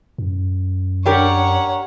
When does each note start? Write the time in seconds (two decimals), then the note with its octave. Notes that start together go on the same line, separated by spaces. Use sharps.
0.18 F#2
1.06 D4 G4 A#4 C#5 F#5